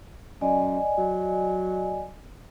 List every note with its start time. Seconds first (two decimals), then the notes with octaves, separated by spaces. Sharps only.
0.41 F#2 D5 D#5 G#5
0.98 F#3